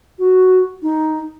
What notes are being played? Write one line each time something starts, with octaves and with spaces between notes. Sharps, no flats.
F#4
D#4